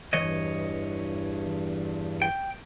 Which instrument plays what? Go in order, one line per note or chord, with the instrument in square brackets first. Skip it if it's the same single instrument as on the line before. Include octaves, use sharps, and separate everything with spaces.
[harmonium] E2 G2 [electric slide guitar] E3 C#5 D#5
[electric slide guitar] G5